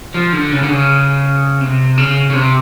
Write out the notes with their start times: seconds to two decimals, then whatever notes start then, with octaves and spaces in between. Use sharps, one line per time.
0.14 F3
0.33 D3
0.52 C#3
0.63 D3
0.70 C#3
1.61 C3
1.97 C#3
2.30 C#3
2.34 C3